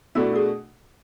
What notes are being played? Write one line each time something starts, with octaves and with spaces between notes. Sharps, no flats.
B2 A3 D4 E4 F#4
G#4